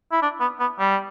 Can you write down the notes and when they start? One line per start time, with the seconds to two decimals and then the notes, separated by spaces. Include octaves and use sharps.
0.12 E4
0.22 D4
0.40 B3
0.60 B3
0.79 G3